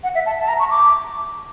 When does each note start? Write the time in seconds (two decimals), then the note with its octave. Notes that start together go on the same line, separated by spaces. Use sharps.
0.04 F#5
0.15 E5
0.26 A5
0.39 A5
0.48 A#5
0.60 C#6
0.70 D6